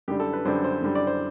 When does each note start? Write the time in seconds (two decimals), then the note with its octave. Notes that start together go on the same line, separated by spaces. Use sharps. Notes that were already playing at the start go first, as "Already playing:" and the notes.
0.08 F#2 D3 G3 G4
0.20 A4
0.33 B4
0.45 F#2 D3 G3 C5
0.64 C5
0.82 F#2 D3 G3
0.95 D5
1.07 C5